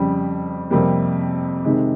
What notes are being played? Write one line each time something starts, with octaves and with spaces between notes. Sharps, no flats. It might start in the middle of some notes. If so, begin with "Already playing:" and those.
Already playing: F2 C#3 G3
F2 C3 G3 A#3
C3 D#3 G#3